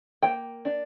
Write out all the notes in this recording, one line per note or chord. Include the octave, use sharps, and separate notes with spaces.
A#3 G5
D4